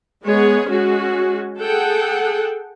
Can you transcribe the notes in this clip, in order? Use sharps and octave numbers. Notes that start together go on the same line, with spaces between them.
G#3 B3 G#4 C#5
G#3 C#4 F#4 G#4
G#4 A4 F#5 G5